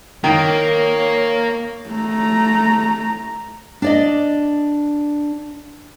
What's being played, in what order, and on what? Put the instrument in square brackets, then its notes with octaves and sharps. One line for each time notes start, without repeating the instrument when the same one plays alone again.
[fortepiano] D#3 [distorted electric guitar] A#3 [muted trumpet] C#5
[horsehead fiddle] A3 A#5
[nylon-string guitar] D4 D5 D#5